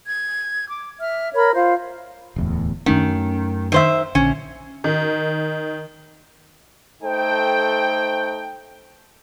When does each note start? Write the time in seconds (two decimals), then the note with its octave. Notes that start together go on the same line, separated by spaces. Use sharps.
0.06 G#6
0.69 D6
1.00 E5 F6
1.34 A#4 C#5 B5
1.54 F4 C5 F5
2.36 D1 E2 A2
2.86 F#2 D#3 A3 C#4
3.72 D#3 C5 E5
4.15 A#1 D3 C#4
4.84 D#3
7.03 A3 D#4 A4 C5 G5